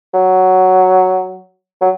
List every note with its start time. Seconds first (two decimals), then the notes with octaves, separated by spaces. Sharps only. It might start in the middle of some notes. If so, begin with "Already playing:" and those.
0.14 F#3
1.81 F#3